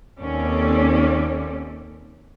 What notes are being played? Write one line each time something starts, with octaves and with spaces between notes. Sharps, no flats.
D#2 C4 C#4 A4 D5